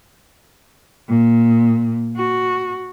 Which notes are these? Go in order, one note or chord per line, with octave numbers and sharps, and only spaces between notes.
A#2
F#4